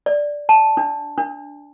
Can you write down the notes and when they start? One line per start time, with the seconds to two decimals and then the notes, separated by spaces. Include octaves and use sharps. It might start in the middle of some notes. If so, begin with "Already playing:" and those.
0.06 D5
0.49 A5
0.77 D4
1.18 D4